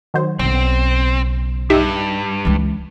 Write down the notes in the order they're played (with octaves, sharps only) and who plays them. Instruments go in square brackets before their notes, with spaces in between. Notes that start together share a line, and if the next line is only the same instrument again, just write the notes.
[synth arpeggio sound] D#3 F#3 C5
[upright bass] B1 C#3 [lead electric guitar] C4
[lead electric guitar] G2 [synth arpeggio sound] D#4 G4 E5
[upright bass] C#2 E3